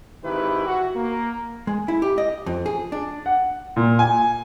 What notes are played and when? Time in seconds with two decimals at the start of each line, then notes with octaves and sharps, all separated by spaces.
0.24 G#1 D#3 E4 G4 B4
0.66 F#4
0.95 A#3
1.67 G#3
1.88 E4
2.02 G4
2.18 D#5
2.46 F2
2.66 G#4
2.92 D4
3.26 F#5
3.76 A#2
3.99 G#5